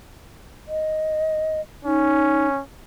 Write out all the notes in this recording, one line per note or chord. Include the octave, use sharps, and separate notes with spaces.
D#5
C#4 D#4